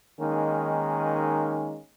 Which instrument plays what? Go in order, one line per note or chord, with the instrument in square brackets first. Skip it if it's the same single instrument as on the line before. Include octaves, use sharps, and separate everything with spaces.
[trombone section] D#3 G#3 A#3 C#4 D#4